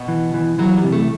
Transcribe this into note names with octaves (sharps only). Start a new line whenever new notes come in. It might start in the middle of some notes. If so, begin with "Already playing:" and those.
Already playing: B2
E3
E3
E3 F#3
G3
C3
A3